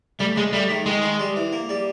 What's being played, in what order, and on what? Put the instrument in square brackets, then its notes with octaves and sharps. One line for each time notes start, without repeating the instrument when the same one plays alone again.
[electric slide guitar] G3 [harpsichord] A3
[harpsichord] C#3 [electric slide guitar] G#3
[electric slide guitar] G3 [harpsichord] A3
[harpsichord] D#3
[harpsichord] D#3 [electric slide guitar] G#3
[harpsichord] D#3
G3
E3
A#3
G3